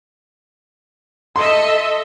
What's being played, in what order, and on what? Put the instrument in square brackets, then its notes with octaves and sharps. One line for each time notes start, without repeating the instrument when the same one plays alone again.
[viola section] A4 D#5 E5 [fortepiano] C6